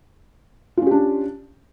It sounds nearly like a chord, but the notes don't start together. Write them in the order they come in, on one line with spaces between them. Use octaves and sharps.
F4 C#4 G4 D4